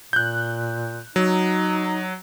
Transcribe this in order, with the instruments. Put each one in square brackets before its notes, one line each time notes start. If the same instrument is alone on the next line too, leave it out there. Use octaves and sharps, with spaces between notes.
[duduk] A#2 [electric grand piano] F#6 G6
[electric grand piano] F#3 [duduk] D#4